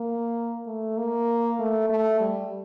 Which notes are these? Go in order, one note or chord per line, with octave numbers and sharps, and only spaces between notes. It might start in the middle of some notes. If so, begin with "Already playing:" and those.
Already playing: A#3
A3
A#3
A3
A3
G3